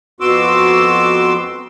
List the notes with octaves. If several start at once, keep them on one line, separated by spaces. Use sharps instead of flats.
F2 B3 F#4 C6 D6 E6